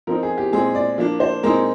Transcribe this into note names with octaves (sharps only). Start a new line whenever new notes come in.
F3 C4 D#4 A#4
G#4
G4
A#2 G#3 C4 G#4
D5
F3 A#3 D4
C5
A#2 G#3 C4 D#4 A#4